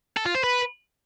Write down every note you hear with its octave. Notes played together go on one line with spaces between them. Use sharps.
A4
F4
C5
B4